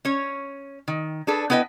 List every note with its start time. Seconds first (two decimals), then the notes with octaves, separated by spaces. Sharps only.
0.05 C#4 C#5
0.88 D#3
1.27 D4 G#4 A4 B4
1.50 B3 E4 B4 D5 D#5 G5